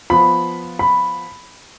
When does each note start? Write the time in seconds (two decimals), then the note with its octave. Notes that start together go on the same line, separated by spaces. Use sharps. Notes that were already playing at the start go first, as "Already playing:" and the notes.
0.10 F3 B3 F4 B5
0.79 B5